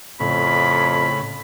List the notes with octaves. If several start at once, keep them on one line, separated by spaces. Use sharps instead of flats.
F2 A2 C#3 B5